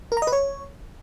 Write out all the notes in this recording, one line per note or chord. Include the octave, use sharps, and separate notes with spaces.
A#4
A#5
D#5
B4
C#5